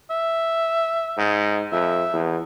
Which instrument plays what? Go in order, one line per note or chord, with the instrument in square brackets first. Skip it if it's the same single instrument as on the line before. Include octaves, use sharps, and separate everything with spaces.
[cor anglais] E5
[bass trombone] G#2
[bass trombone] F2 [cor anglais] E5
[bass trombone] E2